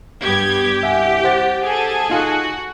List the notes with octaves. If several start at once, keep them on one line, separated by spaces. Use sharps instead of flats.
G2 B3 G4 G#6
C2 E5 F#5 G#5
C5 F#5 A6
G#4 A4 G#5
D#4 F4 F#4